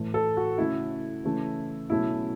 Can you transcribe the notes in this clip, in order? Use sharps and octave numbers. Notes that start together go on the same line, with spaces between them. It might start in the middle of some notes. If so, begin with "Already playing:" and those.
Already playing: A2 E3 A3
A4
F#4
C#3 A3 C#4 E4
C#3 E3 A3 C#4
B2 F#3 A3 C#4 E4